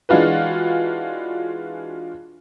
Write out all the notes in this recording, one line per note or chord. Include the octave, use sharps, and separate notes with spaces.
E3 G#3 D4 F4 F#4 B4